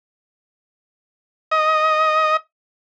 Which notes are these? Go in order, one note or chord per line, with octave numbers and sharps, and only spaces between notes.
D#5